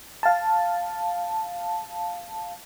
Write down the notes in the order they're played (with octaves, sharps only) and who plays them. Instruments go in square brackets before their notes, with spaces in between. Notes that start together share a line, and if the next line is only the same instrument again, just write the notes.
[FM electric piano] F5 A5